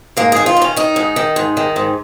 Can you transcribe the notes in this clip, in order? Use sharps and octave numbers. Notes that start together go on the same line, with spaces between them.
G#2 A#3
D#3 G#4
F4
D#3
C#4
D#3 D#4
G#2
D#3
G#2
D#3
G#2